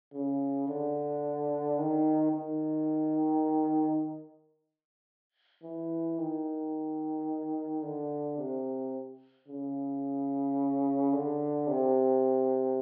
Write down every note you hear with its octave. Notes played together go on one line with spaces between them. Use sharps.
C#3
D3
D#3
D#3
E3
D#3
D3
C3
C#3
D3
C3